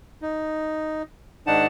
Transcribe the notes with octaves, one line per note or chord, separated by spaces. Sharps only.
D#4
G#2 D#3 D4 D#4 F#5 A5